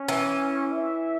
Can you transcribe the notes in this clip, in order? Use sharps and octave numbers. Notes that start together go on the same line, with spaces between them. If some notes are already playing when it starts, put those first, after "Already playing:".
Already playing: C#4
E3
E5